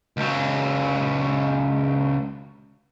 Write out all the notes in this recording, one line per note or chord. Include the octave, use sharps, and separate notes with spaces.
C#2 F#3